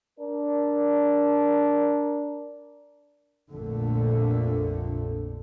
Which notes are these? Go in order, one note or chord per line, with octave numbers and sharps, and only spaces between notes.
D4 A#4
A#1 F2 A#2 D3 A3